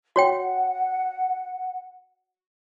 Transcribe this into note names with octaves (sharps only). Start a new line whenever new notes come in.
F#4 C#5 F#5 G5